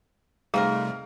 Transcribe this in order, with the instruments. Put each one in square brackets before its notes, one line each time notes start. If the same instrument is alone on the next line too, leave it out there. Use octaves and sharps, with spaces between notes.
[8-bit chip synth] C3 G3 A3 [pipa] D#3 F3 A#4 [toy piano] G#4 [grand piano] F5